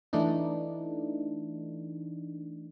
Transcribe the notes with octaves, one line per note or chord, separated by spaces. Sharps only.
E3 A3 D4 D#4